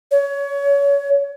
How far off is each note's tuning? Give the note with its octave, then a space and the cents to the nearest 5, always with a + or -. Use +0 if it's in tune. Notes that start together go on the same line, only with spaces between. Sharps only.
C#5 +25